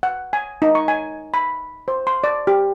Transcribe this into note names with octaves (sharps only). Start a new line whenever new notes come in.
F#5
G#5
D#4
C#6
G#5
B5
C5
C6
D5
G4